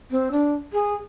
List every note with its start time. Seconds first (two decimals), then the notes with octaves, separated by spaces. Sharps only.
0.11 C4
0.32 D4
0.73 G#4